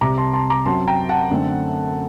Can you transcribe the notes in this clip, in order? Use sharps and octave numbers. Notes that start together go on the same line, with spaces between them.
C2 C3 G3 C4 A#5 D6
A5 C6
A5 C6
A#5 D6
F#2 F#3 C4 A5 C6
G5 A#5
F#5 A5
F#2 D3 A3 C4